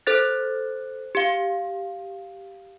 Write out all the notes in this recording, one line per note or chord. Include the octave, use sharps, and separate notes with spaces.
A4 C5 F#6 A6
G4 F5